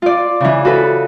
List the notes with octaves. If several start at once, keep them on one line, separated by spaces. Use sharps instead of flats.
F4 D5
C#3 E3
F#4 A4 B4